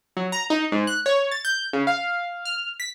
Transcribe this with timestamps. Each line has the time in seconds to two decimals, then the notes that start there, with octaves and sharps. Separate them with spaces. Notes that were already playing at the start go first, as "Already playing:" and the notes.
0.17 F#3
0.32 A#5
0.50 D#4
0.72 G#2
0.87 F#6
1.06 C#5
1.31 A6
1.45 G6
1.73 C#3
1.87 F5
2.45 F6
2.80 B6